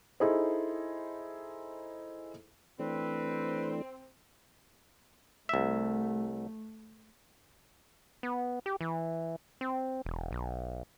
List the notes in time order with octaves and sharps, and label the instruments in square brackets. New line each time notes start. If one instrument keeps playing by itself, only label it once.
[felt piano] D#4 E4 G#4 A4 C5
[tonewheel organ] E3 A3 D4 [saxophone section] C4 [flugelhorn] B4
[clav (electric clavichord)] C2 E5 [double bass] A3
[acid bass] B3
G4
E3
C4
E1
B1